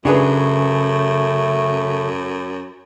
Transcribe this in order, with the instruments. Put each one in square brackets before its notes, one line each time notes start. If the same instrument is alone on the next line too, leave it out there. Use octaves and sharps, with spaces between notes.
[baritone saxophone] F#2 [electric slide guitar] C#3 [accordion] A3 [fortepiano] D4 G#4 B4